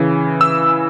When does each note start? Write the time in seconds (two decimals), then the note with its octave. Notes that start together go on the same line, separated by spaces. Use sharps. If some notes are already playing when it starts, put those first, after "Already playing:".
Already playing: C#3 E3
0.41 E6